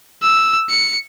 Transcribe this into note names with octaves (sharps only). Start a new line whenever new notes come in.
E6
C#7